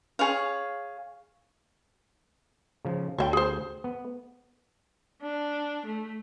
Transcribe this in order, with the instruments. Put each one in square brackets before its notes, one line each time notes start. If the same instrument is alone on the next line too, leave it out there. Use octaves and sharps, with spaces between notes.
[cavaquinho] G#4 C#5 F5
[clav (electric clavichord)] C#3 F3
[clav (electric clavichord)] D2 [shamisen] C#5 E5 G5
[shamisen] G#4 C5
[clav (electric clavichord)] B3
[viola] D4
A3